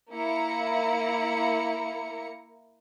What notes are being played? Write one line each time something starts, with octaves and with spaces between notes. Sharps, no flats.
A#3 E4 A#5 C#7